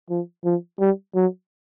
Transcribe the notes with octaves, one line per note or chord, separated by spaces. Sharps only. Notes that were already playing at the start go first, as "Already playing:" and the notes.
F3
F3
G3
F#3